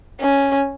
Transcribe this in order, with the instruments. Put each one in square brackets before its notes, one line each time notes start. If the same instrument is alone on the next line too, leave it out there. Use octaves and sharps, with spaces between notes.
[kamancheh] C#4